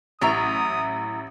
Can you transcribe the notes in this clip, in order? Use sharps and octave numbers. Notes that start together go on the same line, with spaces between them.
A1 F#3 E4 E5 A#5 D#6